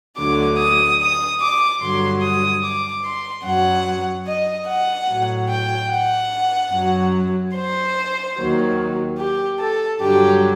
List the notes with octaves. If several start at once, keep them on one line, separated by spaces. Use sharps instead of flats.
D2 D3 F#3 D6
D#6
D#6
D6
G2 D3 F#3 C6
D#6
D6
C6
F#2 F#3 F#5
D#5
F#5
A2 F#3
G5
F#5
F#2 F#3
C5
D#2 D#3 F#3
G4
A4
G2 D3 F#3 G4